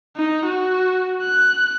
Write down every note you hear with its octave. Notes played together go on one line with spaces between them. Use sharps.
D#4
F#4
F#6